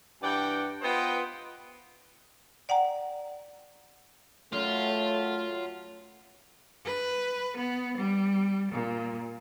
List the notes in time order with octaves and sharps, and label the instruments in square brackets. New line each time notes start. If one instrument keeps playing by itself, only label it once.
[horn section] G2 E3 D5 F#5 G5
B3 F4 B4 C5 D#5 G5
[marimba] D5 F#5 G5 A#5
[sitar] F#2 [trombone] A3 [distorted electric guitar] F4
[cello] B4
B3
G3
A#2